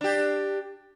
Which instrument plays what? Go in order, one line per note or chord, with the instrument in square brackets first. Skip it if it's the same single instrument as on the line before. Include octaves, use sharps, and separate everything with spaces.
[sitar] D4 G4